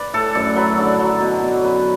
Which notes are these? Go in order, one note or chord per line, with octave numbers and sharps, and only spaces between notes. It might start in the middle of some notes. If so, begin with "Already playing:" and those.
Already playing: B4 D5
A2 A4
F#2 D5
F#3 B4
D3 D5
F#3
B2
B2
F#2 B4